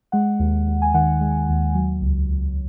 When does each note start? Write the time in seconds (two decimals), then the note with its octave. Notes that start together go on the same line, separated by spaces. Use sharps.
0.12 G#3 F#5
0.39 D#2
0.67 D#2
0.82 G#5
0.94 D#3 F#5
1.21 G#3
1.49 D#2
1.75 F#3
2.02 C#2
2.29 C#2